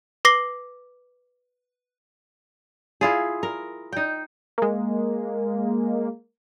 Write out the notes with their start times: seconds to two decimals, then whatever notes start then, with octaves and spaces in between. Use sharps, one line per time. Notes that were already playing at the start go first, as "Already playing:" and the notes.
0.25 B4 D6 A#6 C7 G7
3.01 E4 F4 G#4
3.43 A#4
3.93 D#4 G5
4.58 G#3 A#3